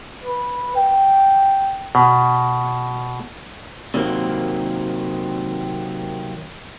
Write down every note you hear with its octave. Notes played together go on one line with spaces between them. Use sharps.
B4
G5
B2
C3 D#3 F#3 A#3 C4